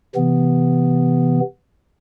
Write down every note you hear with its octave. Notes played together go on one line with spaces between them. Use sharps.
C3 E3 B3